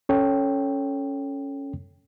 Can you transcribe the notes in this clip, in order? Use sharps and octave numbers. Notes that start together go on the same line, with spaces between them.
C#4 A4 C#5 G5